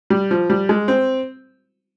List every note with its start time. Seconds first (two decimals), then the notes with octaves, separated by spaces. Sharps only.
0.10 G3
0.31 F3
0.50 G3
0.69 G#3
0.88 C4